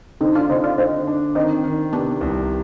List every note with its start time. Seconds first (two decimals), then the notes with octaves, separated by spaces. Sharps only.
0.20 D3 C4 D#4
0.35 D4 F4
0.49 D3 C4 D#4
0.64 D4 F4
0.78 D3 C4 D#4
1.07 D4
1.35 D#3 C4 D#4
1.64 D#3
1.93 C3 B3 D4
2.21 C2